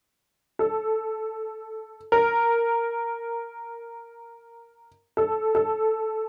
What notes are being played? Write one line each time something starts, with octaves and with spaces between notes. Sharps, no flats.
A4
A#4
A4
A4